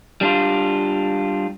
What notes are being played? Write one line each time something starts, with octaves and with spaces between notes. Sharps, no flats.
G3 D4 F4